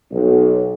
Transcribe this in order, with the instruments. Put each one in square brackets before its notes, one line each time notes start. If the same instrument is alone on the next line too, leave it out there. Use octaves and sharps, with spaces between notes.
[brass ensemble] B1